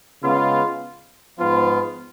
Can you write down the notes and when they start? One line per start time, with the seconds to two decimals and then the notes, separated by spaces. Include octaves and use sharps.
0.22 C#3 G#3 B3 F4
1.38 G#2 F3 B3 F4